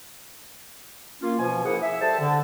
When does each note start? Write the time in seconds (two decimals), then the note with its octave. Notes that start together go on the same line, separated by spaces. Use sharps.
1.22 A#3 C#4 F4
1.38 B2 F3 G#5
1.65 A#3 E4 G#4 C5 F#5
1.82 E5
2.01 G3 A4 C5 A5
2.20 D3